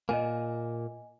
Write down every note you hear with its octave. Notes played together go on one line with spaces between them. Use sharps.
A#2 A#3 D#5 G#5